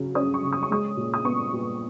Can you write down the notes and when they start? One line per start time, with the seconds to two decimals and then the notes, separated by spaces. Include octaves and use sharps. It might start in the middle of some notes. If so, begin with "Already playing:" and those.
Already playing: C#3 F#3
0.15 C#4 D#6
0.34 C#6
0.43 C#3
0.53 D#6
0.63 C#6
0.70 G#3 D#6
0.97 A#2
1.14 D#6
1.25 B3 C#6
1.53 A#2